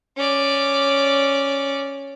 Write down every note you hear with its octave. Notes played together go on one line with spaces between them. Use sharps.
C#4 D5